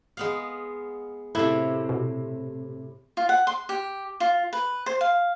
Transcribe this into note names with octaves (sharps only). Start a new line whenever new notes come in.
G#3 B3 F5
A2 C3 E4
B2
F4
F#5
C6
G4
F4
B4
C5
F5